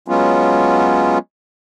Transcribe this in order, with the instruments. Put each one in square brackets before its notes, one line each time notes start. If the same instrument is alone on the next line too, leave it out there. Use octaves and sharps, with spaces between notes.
[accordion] F#3 G#3 B3 C#4 F4